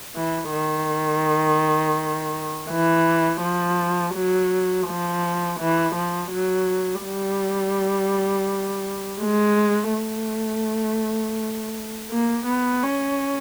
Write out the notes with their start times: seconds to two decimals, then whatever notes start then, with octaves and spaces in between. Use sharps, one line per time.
0.16 E3
0.53 D#3
2.70 E3
3.41 F3
4.15 F#3
4.87 F3
5.60 E3
5.95 F3
6.32 F#3
7.04 G3
9.22 G#3
9.93 A3
12.11 A#3
12.47 B3
12.83 C#4